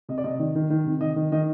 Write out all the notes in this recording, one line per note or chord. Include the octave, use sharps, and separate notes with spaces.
C3 D#5
D5
C3 D#5
D#3
D#3
D#3
C3
D#3 D#5
D#3
D#3 D#5